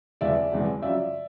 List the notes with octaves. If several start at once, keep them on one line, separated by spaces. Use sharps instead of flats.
E1 E2 C3 E3 G#3 D5 E5
E1 E2 C3 E3 G#3
F#2 C#3 F3 D5 E5